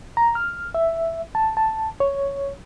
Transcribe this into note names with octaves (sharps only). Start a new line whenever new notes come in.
A#5
F6
E5
A5
A5
C#5